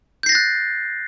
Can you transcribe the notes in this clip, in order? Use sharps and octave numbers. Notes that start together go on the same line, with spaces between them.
F#6 G6 A6 A#6 C7